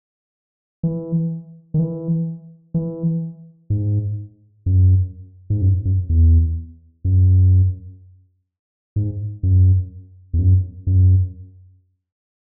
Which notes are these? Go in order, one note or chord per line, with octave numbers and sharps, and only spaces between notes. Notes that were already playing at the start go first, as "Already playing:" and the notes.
E3
D#3
E3
E3
G#2
F#2
G#2
F#2
F#2
E2
F#2
G#2
F#2
E2
F#2
F#2